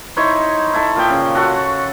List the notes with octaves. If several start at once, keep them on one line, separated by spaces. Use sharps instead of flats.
D#4 E4 C5 C#5
E4 A4
A#2 F3 G5
C#3
F#4 A4 F#5